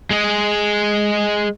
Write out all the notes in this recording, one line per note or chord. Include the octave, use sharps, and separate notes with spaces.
G#3 G#4